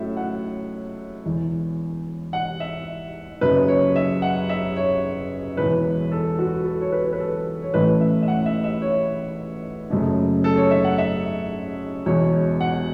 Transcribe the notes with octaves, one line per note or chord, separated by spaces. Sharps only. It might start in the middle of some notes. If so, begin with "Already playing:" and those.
Already playing: A2 F#3 A3 C#4 A4 C#5 E5
F#5
E1 E2 E3
F#5
E5
F#1 F#2 C#3 B4
C#5
E5
F#5
E5
C#5
E1 E2 E3 B4
A4
F#4
A4
C#5
B4
C#5
B4
A4
C#5
A1 A2 E3 A3 C#4 B4
E5
E5
F#5
E5
E5
C#5
F#1 F#2 C#3 A3 C#4
A4
C#5
E5
F#5
E5
E1 E2 B2 C#5
F#5